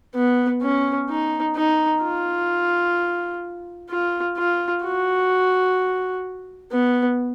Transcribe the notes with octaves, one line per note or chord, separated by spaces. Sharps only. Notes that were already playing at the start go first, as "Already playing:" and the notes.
B3
C#4
D#4
D#4
F4
F4
F4
F#4
B3